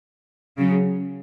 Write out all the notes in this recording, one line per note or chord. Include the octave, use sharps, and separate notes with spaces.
C#3 F#3